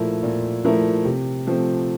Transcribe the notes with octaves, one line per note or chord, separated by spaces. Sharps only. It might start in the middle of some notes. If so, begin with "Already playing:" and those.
Already playing: A#2 F3 A3 E4 A#4
A#2
F3 A3 E4 A#4
C3
F3 A3 C4